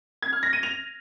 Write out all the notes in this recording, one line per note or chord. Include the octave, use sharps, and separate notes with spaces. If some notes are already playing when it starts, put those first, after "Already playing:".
G#6
F6
A#6
D#7
F7